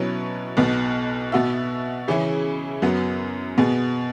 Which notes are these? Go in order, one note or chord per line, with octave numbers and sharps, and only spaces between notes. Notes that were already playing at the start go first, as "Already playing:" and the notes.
Already playing: B2 F#3 C#4 E4 B4
B1 B2 B3
B2 B3 F#4 E5
C#3 E3 C#4 E4 G#4
F#2 F#3 B3
B2 B3 G#4